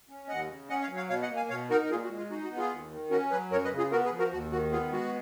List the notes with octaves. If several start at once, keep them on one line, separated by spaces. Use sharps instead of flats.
C#4
D#2 D#5 F#5
C#3
C#4 D#5 F#5
C#5 F5
F#3
C#5 F5
B2 C#5 F5
D#5 F#5
A#3
F5 G#5
B2 C#5 F5
D#4 F#4 A#4
A#4
A#2 F4 G#4
F#4
G#3
F4
D#4 F#4
F#4
B3
F4 G#4
D#2
D#3
C#4 F#4 A#4
F#3 G#4 B4
F#2 A#4 C#5
B4 D#5
C#3
F4 G#4
B3 F#4 A#4
G#4 B4
F3
F#4 A#4
D#2 F#4
D#3 F#4
B3 F4 G#4
G#3 F#4